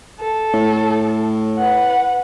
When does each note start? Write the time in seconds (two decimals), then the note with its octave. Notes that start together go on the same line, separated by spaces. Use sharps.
0.19 A4
0.54 A2
1.57 B4 F#5